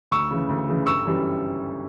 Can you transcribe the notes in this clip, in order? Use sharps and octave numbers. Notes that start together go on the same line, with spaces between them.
D2 C#6 E6
C#3 E3
D2
C#3 E3
G1 C#6 E6
F#2 E3 G3